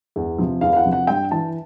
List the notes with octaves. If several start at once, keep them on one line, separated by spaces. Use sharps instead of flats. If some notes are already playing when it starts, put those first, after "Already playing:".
E2
C3 F3
E2 F5
F5
F#5
C3 F3
F#5
G2 G5
E3 A5